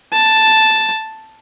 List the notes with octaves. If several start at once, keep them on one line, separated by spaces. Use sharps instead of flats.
A5